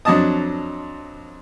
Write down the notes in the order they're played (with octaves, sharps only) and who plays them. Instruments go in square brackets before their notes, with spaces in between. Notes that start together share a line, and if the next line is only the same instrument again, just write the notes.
[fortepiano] F2 F#3 D4 D#5 A5 D#6